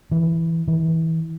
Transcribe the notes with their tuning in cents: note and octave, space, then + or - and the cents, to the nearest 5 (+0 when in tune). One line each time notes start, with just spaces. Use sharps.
E3 +0
E3 -25